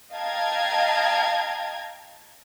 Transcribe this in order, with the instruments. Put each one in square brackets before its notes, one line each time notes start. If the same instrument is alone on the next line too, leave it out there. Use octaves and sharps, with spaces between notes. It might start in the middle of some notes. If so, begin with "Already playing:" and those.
[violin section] D#5 F5 G5 A5 A#5 G#6